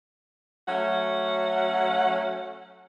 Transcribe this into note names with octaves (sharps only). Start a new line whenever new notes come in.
F#3 A3 C#4 F#5